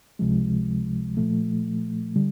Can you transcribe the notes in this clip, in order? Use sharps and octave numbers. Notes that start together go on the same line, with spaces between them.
C#2 C3 F3 G#3
A#2 F3 A3
D3 G3